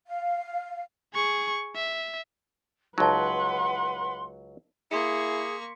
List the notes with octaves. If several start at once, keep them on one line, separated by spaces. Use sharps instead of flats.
F5
G#4 C#6
E5
C#2 F#3 D#4 B4 F#5 A5 C6
A#3 E4 G#4 C6 C#6 B6 C#7